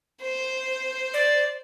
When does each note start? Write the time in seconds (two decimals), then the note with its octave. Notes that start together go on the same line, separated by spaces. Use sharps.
0.22 C5
1.14 D5